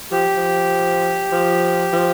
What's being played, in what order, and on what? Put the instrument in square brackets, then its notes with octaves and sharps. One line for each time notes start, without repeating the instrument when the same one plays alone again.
[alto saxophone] F3 [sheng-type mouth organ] G4
[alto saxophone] F3
F3
F3